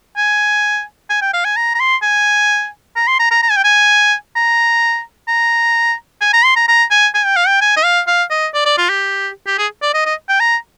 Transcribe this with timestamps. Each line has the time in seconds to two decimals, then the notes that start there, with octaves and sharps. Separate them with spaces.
0.17 G#5
1.10 G#5
1.22 G5
1.33 F5
1.45 G#5
1.56 A#5
1.75 A#5
1.80 C6
2.02 G#5
2.96 A#5
3.08 C6
3.19 A#5
3.31 A#5
3.42 A#5
3.49 G#5
3.56 G5
3.64 G#5
4.35 A#5
5.28 A#5
6.21 G#5
6.33 A#5
6.44 C6
6.56 A#5
6.68 A#5
6.91 G#5
7.14 G#5
7.25 G5
7.37 F5
7.47 G5
7.61 G#5
7.76 D#5
7.84 F5
8.07 F5
8.30 D#5
8.54 D5
8.65 D5
8.77 F4
8.89 G4
9.47 G4
9.58 G#4
9.82 D5
9.94 D#5
10.06 D#5
10.28 G5
10.40 A#5